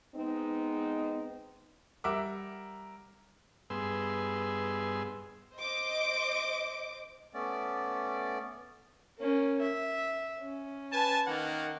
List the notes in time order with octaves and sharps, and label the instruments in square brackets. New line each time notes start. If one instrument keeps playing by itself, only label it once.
[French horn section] G#3 B3 C4 D#4
[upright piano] G3 A#4 E5 F#5 D6
[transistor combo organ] G2 B3 G#4 C6 E6
[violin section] C5 D#5 D6
[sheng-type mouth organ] A3 B3 C#4 D5
[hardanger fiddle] A#3 C#4
E5
C#4
[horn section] B4 G#5 A5
D#3 A#3 F#5